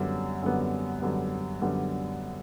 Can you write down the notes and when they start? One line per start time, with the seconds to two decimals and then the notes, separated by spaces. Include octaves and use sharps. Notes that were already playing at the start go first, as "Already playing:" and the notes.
Already playing: F#2 D3 G3 B3
0.42 F#2 D3 G3 B3
1.02 F#2 D3 G3 B3
1.61 F#2 D3 G3 B3